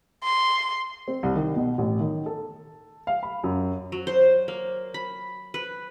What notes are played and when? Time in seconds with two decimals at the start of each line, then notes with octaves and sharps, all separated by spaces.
0.24 C6
1.08 C4
1.23 C2
1.35 D#3
1.56 B2
1.78 A1
2.00 D#3
2.26 A4
3.07 F5
3.23 B5
3.44 F#2
3.92 F#3
4.07 C5
4.48 A#3
4.94 B5
5.54 B4